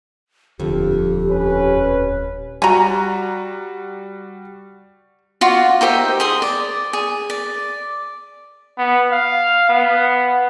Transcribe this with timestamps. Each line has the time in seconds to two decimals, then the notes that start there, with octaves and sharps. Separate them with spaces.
0.60 D#1 F2 D3 F3 G4
1.29 C#4 B4
2.62 G3 F#4 G#5 A#5
5.41 F4 F#4 D5
5.81 D#4 G4 C5 E5
6.20 G#4 C6 D#6
6.42 D5
6.93 G#4
7.30 D5
8.78 B3
9.12 F5
9.70 B3